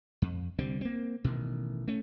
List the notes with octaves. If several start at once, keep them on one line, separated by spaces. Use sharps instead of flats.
F2
C2 D3 G3 C4
A#3 C4
A1 B2 D#3
A3 C#4